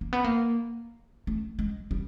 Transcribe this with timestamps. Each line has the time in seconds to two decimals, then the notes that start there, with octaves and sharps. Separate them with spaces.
0.01 A#3
0.13 B3
0.24 A#3
1.27 A3
1.59 G#3
1.91 G3